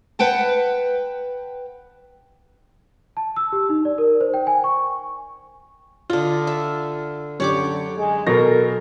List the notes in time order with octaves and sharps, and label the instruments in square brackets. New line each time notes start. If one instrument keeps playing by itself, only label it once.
[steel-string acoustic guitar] B4 F#5 G5 A5
[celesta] A5
E6
G4
D#4
D5
A#4
C5
G5
G#5
C#6
[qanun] D3 D#5 [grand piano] F4
[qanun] E5
[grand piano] F#2 G4 [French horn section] D3 [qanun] C#5 D5 D6
[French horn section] G#3
[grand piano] B2 F#3 A#6 [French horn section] A4 A#4